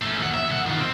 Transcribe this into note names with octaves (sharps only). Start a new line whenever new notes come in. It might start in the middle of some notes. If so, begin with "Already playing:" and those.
A3 C#4
D#2 F#5
E5
C2 F#5
D#3 F4
C4